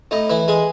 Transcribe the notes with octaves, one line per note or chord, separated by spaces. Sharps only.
A2 D#4
E3 E4
G#3 G#4